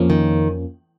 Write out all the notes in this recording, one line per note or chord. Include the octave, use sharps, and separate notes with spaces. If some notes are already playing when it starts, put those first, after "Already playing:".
Already playing: F2 F3 A#3 C#4
D#3